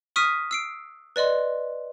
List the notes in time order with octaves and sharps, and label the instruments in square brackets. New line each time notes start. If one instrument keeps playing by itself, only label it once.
[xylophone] C#6 D#6 F6 B6 D#7
E6 C7 D7
B4 D5 D#5 C6